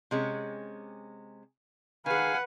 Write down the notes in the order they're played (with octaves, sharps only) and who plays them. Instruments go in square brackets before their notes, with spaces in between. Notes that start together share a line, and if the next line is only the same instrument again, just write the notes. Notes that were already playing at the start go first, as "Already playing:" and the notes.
[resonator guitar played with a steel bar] C3 G#3 C#4
[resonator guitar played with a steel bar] D#3 G#4 [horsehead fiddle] B4 F#5 [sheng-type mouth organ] F5 G#5